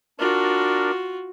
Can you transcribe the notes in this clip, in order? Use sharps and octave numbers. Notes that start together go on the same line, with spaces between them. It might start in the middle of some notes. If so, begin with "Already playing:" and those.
D4 F4 F#4 A#4